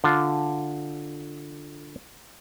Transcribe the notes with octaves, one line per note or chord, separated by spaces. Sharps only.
D3 F4